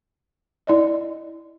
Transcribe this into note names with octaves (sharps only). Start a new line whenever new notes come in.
E4 D5 D#5